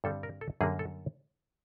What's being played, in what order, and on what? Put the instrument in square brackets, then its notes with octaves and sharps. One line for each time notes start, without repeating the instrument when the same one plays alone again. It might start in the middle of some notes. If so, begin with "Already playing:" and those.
[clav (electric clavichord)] G2 D3 G3 C4 A4
A#4
A4
F#2 D3 G3 A#3 G#4
A4